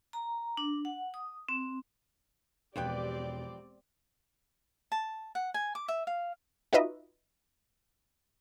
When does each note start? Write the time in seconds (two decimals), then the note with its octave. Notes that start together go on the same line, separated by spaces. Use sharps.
0.13 A#5
0.57 D4
0.85 F#5
1.14 D#6
1.49 C4
2.76 E1 F2 C4 G4 B4 D5 G5
4.92 A5
5.35 F#5
5.54 G#5
5.75 D6
5.88 E5
6.07 F5
6.73 D#4 F4 F#4 B4 D#5 E5